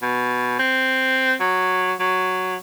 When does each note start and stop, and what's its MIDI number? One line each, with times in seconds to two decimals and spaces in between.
0.02 0.54 47
0.59 1.35 60
1.40 1.93 54
2.00 2.56 54